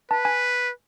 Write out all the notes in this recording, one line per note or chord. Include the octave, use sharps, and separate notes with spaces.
B4 A5
G#5